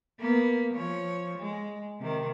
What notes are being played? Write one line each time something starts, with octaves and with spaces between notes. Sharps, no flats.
A#3 B3
F3 C#5
G#3
C3 D#3